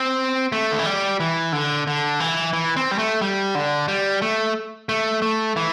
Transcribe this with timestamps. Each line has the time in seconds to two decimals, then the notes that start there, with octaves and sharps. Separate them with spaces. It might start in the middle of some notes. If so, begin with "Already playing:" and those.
Already playing: C4
0.52 A3
0.72 D3
0.79 E3
0.86 G3
1.20 E3
1.52 D3
1.87 D3
2.20 E3
2.53 E3
2.76 C4
2.91 G3
2.98 A3
3.21 G3
3.55 D3
3.88 G3
4.22 A3
4.89 A3
5.22 A3
5.56 E3